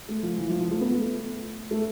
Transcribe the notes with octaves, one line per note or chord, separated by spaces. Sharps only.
A3
F3
E3
F3
F3
A3
B3
A3
A3